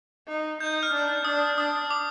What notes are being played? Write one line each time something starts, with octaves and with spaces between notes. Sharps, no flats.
D#4
D#4 G6
F6
D4
D4 D#6
D4 D#6
D6